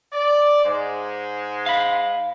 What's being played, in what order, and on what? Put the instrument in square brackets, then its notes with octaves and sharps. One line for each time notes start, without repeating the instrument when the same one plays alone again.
[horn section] D5
G#2 G#3 C5
[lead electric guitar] F5 B5